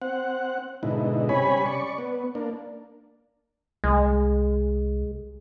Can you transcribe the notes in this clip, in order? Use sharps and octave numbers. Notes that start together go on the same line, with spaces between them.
C4 F#5
G#2 B2 D3 D#4 E4
C3 G3 C#4 C#5 G#5 B5
D5 C#6
B3
A#3 D4
C2 G#3